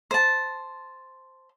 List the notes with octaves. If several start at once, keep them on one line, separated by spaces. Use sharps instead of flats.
C5 A5